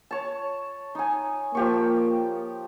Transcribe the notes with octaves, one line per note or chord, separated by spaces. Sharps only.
C#5 A5
D#4 G#5
F3 A#3 G4 C#6